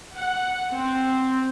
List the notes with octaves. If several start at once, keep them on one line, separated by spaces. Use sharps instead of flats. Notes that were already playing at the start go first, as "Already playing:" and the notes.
F#5
C4